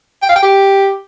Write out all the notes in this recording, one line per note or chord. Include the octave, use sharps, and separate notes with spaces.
G5
F5
G5
G4